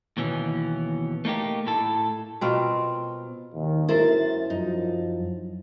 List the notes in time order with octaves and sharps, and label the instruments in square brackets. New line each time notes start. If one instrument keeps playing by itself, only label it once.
[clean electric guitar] D#2 B2 E3 C#4
A3 A#3 D#4 G4
A2 A4
[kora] B2 C4 F4 A#4
[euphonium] D#2 [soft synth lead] D#3
[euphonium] F#2 [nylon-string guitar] E4 A#4 C5 [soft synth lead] A6
[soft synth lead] F#2 [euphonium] F3 [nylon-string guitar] D#4